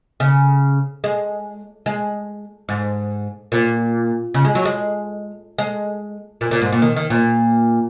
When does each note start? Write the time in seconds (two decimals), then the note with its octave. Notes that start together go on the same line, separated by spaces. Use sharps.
0.20 C#3
1.04 G#3
1.86 G#3
2.69 G#2
3.52 A#2
4.34 C#3
4.45 G#3
4.55 F#3
4.65 G#3
5.58 G#3
6.41 A#2
6.51 A#2
6.62 G#2
6.72 A#2
6.82 D#3
6.96 D#3
7.10 A#2